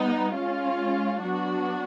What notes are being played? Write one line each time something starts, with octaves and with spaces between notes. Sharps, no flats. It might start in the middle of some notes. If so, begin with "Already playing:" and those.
Already playing: G3 B3 D#4
G#3 C#4 F4
F#3 B3 D4 F#4